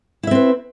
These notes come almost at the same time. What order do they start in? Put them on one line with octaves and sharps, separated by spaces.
E4 E5 C4 B4